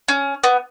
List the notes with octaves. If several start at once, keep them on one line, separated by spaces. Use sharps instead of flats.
C#4
B3